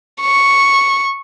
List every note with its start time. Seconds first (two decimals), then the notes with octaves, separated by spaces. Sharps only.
0.21 C#6